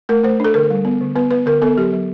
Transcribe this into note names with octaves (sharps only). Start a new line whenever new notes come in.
A3 A#4
A3 C5
D4 A4
D3 A#4
G3
B3
D3
B3 B4
B3 B4
D3 A#4
B3 A4
F#3 G4
F#3